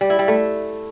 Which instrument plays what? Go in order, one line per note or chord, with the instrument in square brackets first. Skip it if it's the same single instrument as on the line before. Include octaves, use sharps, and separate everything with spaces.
[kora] G3
E4
G3
A3